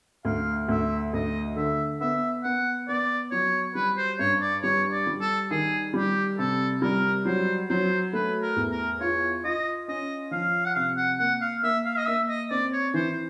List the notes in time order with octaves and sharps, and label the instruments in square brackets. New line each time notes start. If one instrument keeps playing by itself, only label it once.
[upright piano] D2 [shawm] F5
[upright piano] D2 [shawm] E5
[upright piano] D2 [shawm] D#5
[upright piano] D3 [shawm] E5
[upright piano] B3 [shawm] E5
[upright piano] B3 [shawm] F#5
[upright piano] B3 [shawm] D5
[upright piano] F#3 [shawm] C#5
[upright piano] G3 [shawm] B4
[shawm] C5
[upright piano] G2 [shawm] C#5
[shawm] D5
[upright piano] G3 [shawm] C#5
[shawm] D5
[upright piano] G3
[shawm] A4
[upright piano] D#3 [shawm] G#4
[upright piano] G3 [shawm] G4
[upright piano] C3 [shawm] A4
[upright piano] G3 [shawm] A#4
[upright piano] F#3 [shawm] C5
[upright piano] F#3 [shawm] C5
[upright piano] A3 [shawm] B4
[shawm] A#4
[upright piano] E2
[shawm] A#4
[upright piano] F4 [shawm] C#5
[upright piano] F4 [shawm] D#5
[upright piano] C#4 [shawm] D#5
[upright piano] F3 [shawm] F5
[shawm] F#5
[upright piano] C3 [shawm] F5
[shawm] F#5
[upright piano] A#3 [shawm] F#5
[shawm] F5
[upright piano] A#3 [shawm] E5
[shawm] F5
D#5
[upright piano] A#3 [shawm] E5
[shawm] D#5
[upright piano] C4 [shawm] D5
[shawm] C#5
[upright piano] E3 [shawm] C5